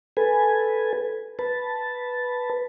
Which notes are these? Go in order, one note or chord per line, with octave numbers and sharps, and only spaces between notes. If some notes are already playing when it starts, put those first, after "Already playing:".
A4 B4 G#5
B4 A5